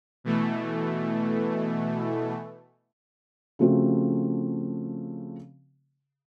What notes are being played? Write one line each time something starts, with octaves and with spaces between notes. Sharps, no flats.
B2 E3 A3
C#3 F3 A3 C4 F#4